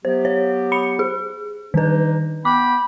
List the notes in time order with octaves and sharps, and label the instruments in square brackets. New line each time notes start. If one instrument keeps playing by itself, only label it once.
[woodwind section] F#3 B3 G4 [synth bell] C5
[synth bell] C#5
B5 C#7
G#4
[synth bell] D#3 B4 [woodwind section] D4 D#4
[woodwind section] B3 G5 B5 [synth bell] D6